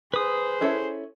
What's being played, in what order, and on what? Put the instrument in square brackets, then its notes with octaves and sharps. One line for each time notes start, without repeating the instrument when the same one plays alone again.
[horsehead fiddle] G#4 C5 [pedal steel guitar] B4 D#6
[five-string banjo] C#4 E4 A4